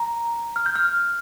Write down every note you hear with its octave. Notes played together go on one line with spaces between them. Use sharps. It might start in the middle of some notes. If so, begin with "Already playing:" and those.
Already playing: A#5
F6
G6
F6